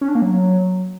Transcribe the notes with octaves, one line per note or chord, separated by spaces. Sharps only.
C#4
D4
A#3
F#3